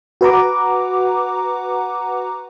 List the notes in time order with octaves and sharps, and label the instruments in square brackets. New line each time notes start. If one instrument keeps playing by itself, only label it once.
[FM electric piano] F#4 B4 F#5 A#5 D6